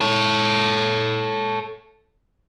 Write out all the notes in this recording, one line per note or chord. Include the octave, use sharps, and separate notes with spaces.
A4 C#5